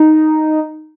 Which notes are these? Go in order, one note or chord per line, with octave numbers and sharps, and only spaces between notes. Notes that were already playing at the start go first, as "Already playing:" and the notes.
Already playing: D#4